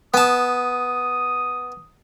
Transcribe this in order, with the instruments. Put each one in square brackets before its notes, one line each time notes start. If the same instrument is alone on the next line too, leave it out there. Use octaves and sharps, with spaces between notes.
[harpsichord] B3 A5 [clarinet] D#6